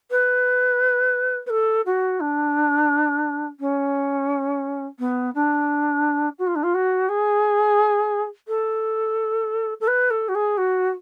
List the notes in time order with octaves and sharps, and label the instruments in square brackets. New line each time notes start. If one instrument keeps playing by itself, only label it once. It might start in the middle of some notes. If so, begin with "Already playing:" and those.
[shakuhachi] B4
B4
A4
F#4
D4
C#4
B3
D4
F#4
F4
D4
F4
F#4
G#4
A4
A4
B4
A4
F#4
G#4
F#4